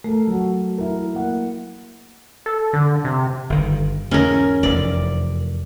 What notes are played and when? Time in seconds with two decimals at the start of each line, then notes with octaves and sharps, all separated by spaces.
0.04 A3 A4 A#4
0.28 F#3 F#4
0.78 E4 A#4
1.15 A#3 F#5
2.46 A4
2.73 D3
3.05 C3
3.50 G1 D#3
4.11 E2 G#2 C#4 A#4
4.63 F1 E2 D5